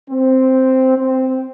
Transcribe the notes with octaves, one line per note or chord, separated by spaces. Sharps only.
C4
C4